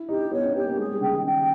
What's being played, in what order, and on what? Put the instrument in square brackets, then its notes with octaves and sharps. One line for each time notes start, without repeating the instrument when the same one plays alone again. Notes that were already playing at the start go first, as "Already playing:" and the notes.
Already playing: [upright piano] E4
[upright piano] D#4 [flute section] G4
[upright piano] B3 [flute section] C#5
[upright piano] C#4
[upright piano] B3 [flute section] G4
[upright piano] A#3
[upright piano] G#3 [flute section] G#4
[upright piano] G3
[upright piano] C#3 [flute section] G5
[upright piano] D#3
[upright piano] C#3 [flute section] G5